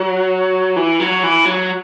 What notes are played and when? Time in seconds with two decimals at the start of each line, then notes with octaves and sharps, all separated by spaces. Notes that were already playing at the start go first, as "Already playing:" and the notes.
Already playing: F#3
0.76 E3
1.00 F#3
1.23 E3
1.45 F#3